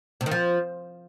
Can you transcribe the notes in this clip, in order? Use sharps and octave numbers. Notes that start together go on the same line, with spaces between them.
C3
D#3
F3